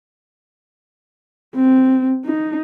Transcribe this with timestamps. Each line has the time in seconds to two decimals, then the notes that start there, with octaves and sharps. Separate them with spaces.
1.55 C4
2.25 D#4